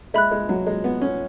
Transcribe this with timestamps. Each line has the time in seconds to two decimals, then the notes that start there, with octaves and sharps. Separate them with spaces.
0.14 G#3 E5 B5 F#6
0.31 G#3
0.49 F#3
0.67 G#3
0.84 B3
1.02 C#4